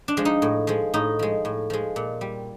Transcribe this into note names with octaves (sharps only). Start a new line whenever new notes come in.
D4
F3 G#3
D#4
A2
F3 G#3
A2 D#4
F3 G#3
A2
F3 G#3
A#2
G3